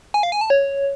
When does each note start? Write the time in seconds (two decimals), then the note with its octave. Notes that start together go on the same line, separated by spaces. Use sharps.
0.14 G#5
0.23 F5
0.32 G#5
0.41 A5
0.50 C#5